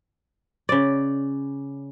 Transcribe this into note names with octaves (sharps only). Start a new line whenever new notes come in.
C#3 D5